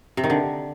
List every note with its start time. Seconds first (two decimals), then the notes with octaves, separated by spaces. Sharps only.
0.17 C3
0.24 D#3
0.30 D3